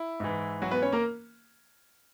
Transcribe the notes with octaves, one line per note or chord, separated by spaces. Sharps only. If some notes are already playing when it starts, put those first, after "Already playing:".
Already playing: E4
G#2 E3
F#3 F#4
B3 B4
C#4 C#5
A#3 A#4